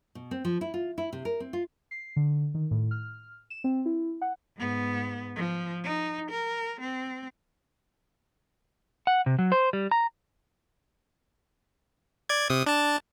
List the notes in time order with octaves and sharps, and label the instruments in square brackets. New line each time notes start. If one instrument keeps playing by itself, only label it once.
[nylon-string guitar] B2
C4
F3
E4
F4
E4
C3
A#4
C4
F4
[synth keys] C7
D3
D#3
A2
F6
E7
C4
E4
F#5
[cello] G#2 B3
F3
D#4
A#4
C4
[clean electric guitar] F#5
C3
F#3
C5
G3
A#5
[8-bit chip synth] D5 G#6
C3 D#6
D4 A5